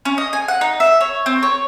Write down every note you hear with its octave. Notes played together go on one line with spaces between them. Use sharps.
C#4
D#5
G#5
F#5
D#4
E5
C#5
C4
C#5